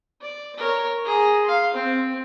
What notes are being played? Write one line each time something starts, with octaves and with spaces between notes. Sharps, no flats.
D5
A#4 C#5
G#4 A#5
F5 C6
C4